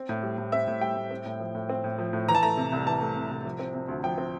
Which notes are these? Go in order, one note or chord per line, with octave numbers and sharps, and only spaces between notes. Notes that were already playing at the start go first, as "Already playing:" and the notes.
Already playing: C4
A2
G3
A2
C4 E5
A2
G3 G5
A2
C4
A2
F3
A2
C4
A2
F3
A2
E3 A#5
A5
A3 A#5
C3
C2
E3 A5
A3
C3
C2
F3
C4
C3
D2
F3 G5
C4